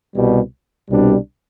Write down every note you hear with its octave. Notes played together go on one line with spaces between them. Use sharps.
C2 B2 G3
C2 B2 G3 D4